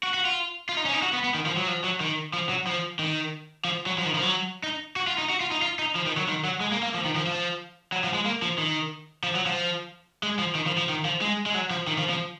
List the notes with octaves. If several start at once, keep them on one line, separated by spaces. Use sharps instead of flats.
F#4
F#4
F4
F4
D#4
C#4
D#4
F#4
B3
B3
D#3
F3
F#3
F3
F#3
D#3
F3
F#3
F3
D#3
F3
F#3
F3
D#3
F3
F#3
D#4
F#4
F4
D#4
F#4
F4
D#4
F4
D#4
F3
D#3
F#3
D#3
F#3
G#3
A#3
A#3
F3
D#3
F3
F3
F#3
F3
G#3
A#3
F3
D#3
F3
F#3
F3
G#3
F3
D#3
F3
F3
D#3
F3
G#3
G#3
F#3
F3
D#3
F3
F3